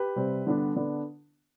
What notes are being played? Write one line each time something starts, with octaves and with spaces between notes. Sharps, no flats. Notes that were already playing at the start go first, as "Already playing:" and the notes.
Already playing: G4 B4
C3 G3 C4
D3 G3 B3 D4
D3 B3 D4